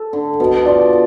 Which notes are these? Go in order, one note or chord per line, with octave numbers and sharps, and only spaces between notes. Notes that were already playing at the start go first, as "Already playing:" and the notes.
Already playing: A4
D3
B2
F4 D5